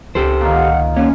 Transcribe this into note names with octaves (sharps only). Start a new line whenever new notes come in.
C#2 G4 A4 C5
A#2 D#3
F#5
A#3 C#4 C#5